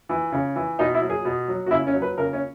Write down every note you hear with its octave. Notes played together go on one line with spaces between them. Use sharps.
E3
C#3
E3
B2 D#4
E4
F#3
G#4
B2
F#3
F#4
C#3 E4
C#4
F#3
B4
C#3 A#4
C#4